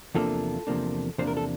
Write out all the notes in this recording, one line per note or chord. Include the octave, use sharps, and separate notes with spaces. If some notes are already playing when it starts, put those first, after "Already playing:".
E2 C3 F3 A#3 D4 F4 A4
E2 C3 F3 A#3 D4
E2 C3 F3 A#3 D4 C5
A#4
A4